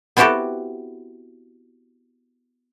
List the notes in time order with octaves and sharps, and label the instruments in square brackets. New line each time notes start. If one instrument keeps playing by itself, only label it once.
[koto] B3 C4 E4 F#4 G4 A4